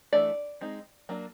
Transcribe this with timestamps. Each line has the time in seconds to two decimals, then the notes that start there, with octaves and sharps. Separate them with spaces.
0.13 E3 A3 D4 D5
0.61 G#3 C4 D#4
1.09 F#3 A#3 D4